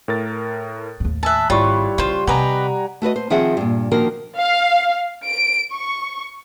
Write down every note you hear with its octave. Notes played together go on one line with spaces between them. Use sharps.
A2 A#4 A6
D#2 A2
E5 G#5 A5 E6 F#6
G#1 G3 E4 F4 C#5 C#6
C#3 F4 C5
C3 G4 B4 D#5 F#5 G#5 A#5
A3 F#4 B4 D#5
C5
D#3 F3 C4 G#4 E5 F#5
G2 A#2
D#3 F3 A#3 D4 F#4 A#4
F5
D7
C#6